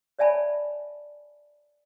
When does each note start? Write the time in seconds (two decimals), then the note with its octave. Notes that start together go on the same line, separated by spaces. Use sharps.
0.19 C#5 D5 E5 G#5 A5 B5